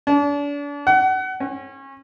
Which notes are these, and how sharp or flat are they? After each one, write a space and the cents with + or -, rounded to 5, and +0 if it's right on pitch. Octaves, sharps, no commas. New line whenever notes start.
D4 -35
F#5 +30
C#4 -30